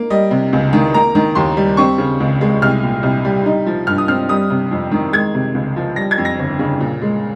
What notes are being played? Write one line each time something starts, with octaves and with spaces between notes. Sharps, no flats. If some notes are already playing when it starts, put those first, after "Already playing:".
Already playing: A#3
G3 D#5
C3
C#2
D#3
A#3 A#5
D#3
D#2 C6
G3
C4 C#6
C#3
C#2
G#3
C2 F6
A#2
C2
G3
D#4
F3
G2 F6
D#6
C4 F6
G3 D#6
C3
F2
D#3
G#3 G#6
C3
C#2
F3
G3 A#6
G#6
F2
A#6
G1
C#3
A#2
G#3